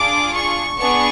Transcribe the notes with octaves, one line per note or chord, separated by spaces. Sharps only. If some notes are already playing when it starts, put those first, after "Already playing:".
Already playing: D4 F4 G#4 D6
C#6
B3 D4 G#4 C#6